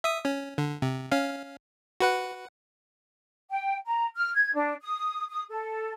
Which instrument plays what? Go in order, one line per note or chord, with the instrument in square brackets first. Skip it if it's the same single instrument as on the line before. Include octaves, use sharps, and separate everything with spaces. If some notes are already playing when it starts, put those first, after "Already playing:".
[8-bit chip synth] E5 D#6
C#4
D3
C3
C#4 F5
F#4 B4 F#5
[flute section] G5
A#5
F6
G#6
D4
D#6
D#6
A4